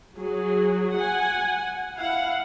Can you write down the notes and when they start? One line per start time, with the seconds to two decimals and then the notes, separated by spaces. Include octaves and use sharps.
0.17 F#3 G#4
0.96 F#5 G#5
1.97 E4 F5 F#5